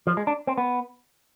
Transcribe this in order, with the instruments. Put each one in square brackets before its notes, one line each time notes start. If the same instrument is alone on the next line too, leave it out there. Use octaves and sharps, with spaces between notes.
[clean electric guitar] F3
G#3
D4
C4
B3